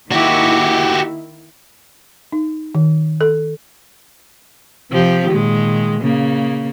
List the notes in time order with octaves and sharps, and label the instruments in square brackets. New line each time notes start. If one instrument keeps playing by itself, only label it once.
[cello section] D#3 A#3 E4 [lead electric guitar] F#4 G4
[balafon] D#4
D#3
A4
[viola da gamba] C3 F3 G4
A#2 D#3 G#3
C#3 A#3